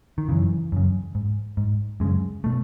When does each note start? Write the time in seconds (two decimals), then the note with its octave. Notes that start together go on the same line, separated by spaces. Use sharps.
0.18 D#3
0.29 F#2 C#3 E3
0.72 F#2 C#3
1.15 G#2
1.57 G#2
2.00 F#2 C#3 G#3
2.44 B2 A3